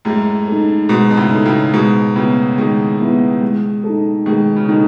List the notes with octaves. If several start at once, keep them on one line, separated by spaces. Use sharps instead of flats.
F#2 A2 G#3
D#4 A4
G#2 B2 G#3
B2
A2 C#3
D#4 A4
A2 C#3
G#2 B2 G#3
A2 C#3 B3 E4
B2 D#3 G#3
B3 E4
G#3
D#4 A4
B2 D#3 G#3
C#3
B2 D#3 D#4 A4